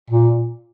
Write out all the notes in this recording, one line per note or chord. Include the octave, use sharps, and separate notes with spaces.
A#2